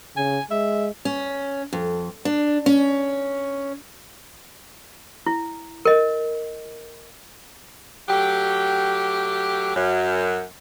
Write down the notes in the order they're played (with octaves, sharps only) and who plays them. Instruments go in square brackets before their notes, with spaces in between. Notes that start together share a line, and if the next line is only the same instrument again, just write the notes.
[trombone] C#3 [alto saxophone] G#5
[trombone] G#3 [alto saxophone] E5
[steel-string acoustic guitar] C#4
F2
D4
C#4
[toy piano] E4
A#4 D#5
[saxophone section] F#3 A3 G4
F#2